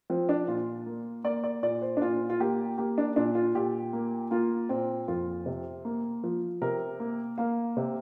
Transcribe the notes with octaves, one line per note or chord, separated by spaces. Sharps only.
F3 C4
D4
A#2 F4
A#3
A#3 D5
D5
A#2 D5
C5
D4
A#2 F4
F4
A#3 G4
A#3 G4
D4
A#2 D4
F4
A#2 G4
A#3
A#3 F4
A#2 C4
F2 F4
C3
A#3
F3
C3 A#4
A#3
A#3 F5
C3